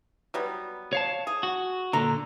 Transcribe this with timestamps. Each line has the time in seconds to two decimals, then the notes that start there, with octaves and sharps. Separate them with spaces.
0.34 F#3 G3 B3
0.93 C#5 F5 A5
1.27 G#4
1.43 F#4
1.93 A#2 D3 A#5